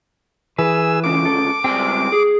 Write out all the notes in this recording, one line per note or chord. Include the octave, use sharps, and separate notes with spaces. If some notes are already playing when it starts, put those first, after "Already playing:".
E3 G#4 B4 E6
D2 C#3 D6
A4
C#2 G3 C4 G#4 G5
G#4